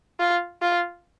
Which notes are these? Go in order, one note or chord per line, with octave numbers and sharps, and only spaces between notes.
F4
F4